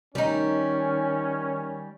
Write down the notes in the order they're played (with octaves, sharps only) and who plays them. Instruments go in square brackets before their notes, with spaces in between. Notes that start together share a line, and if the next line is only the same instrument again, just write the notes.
[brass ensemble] D#3 C#4 [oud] G3 D#4